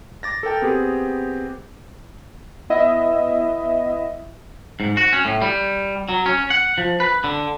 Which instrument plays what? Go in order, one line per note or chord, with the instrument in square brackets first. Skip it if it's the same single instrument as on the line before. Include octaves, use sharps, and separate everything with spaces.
[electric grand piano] D6 A6 A#6
A4 A#4 G5 A6
B3 C4 G4 G#4
[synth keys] B3 E4 D#5 E5
[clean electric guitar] G#2
F#4
C#4
A2
G3
F#3
C#4
F#5
F3
B4
D3